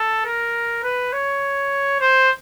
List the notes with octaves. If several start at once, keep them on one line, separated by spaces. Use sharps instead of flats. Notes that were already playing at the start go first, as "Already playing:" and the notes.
Already playing: A4
A#4
B4
C#5
C5